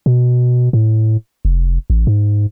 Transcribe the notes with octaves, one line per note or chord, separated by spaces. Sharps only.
B2
A2
F1
A1
G#2